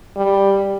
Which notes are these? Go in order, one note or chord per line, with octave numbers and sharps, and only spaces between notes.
G3